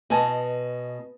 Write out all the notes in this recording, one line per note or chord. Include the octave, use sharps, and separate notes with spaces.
B2 D#5 G#5 A5